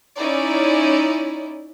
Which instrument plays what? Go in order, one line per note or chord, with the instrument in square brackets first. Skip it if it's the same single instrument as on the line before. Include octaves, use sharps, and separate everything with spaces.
[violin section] C#4 D#4 E4 D5